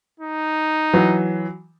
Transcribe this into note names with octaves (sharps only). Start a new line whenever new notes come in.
D#4
E3 F#3